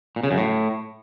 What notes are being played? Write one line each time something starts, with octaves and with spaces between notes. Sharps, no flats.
A#2
C#3
F#2
A2